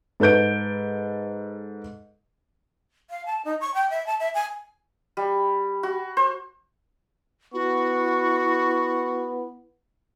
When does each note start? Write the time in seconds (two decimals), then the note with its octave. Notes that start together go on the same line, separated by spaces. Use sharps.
0.20 G#2 A4 B4 G6 D7
3.10 F5
3.26 A5
3.45 D#4
3.61 C#6
3.74 G5
3.90 E5
4.07 A5
4.20 E5
4.34 G#5
5.17 G3
5.83 F#4
6.17 C5
7.54 B3 E4 F#4 C#6